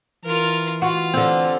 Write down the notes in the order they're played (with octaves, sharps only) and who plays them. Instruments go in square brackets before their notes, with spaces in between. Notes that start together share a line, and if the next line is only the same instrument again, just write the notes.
[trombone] E3 [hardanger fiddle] F4 A#4
[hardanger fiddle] F4 [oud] F#4
[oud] D3 C4